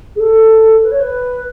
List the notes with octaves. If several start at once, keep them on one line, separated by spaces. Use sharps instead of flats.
G#4
A4
B4
C#5
B4